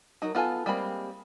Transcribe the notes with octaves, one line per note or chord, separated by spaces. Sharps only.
F#3 D#4 A#4
B3 F4 A4 G#5
G3 G#3 A#3 C4 B5